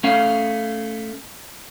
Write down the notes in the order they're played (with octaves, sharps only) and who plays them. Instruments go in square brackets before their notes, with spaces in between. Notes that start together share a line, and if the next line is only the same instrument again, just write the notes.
[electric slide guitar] A3 C#4 F5